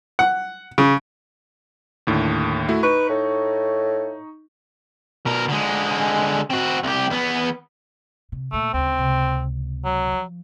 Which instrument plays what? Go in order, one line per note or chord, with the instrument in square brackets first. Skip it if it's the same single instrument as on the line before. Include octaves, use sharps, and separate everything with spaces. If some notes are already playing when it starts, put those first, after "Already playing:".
[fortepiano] F#5
C#3
[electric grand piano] D#2 A2 D3
A3 E4 F#4
[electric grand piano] D#4 C#6 [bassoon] B4
[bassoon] A2
[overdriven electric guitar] B2 A#4
D3 G#3
C4 F#4
C2 G4
E2 B3
[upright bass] C3
[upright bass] D2 A#2 [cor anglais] A3
[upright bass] D2 C#3 [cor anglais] C4
[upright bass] C#2 C3
[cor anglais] F#3
[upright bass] F3